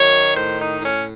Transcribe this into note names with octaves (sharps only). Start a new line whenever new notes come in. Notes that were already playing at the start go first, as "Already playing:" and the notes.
Already playing: F#2 D#3 C#5
A2 C5
D#4
A2 C#4